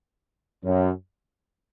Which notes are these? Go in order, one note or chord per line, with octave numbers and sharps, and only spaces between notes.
F#2